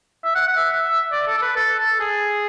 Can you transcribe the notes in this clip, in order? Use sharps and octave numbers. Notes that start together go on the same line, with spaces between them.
E5
F#5
F#5
E5
D5
A4
A4
B4
A4
A4
G#4